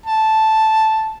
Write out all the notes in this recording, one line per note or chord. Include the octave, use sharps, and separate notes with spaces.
A5